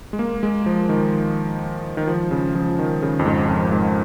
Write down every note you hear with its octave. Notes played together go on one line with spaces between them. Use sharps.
G#3
A#3
G#3
F3
D#3
D#3
F3
C#3
F3
D#3
C#3
F2
G#2
F2
G#2